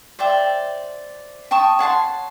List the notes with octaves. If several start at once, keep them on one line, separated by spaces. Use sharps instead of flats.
C5 D5 E5 G5
G5 A5 C#6 D#6
C#5 F#5 A5 C6